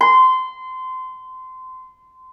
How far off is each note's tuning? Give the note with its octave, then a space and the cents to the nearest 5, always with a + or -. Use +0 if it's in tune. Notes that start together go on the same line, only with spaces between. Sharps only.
C6 -25